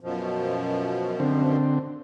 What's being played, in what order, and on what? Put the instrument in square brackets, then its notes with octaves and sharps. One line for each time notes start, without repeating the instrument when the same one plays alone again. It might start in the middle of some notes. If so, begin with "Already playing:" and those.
[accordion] F#2 B2 F3
[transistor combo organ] D3 C4